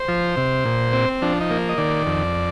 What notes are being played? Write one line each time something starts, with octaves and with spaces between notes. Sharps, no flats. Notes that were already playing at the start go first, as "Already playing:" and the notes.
Already playing: C5
F3
C3
A#2
C4
F3 D4
D#4
A#3
D#5
D#3 D5
F2